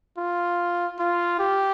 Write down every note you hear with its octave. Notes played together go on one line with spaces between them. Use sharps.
F4
F4
G4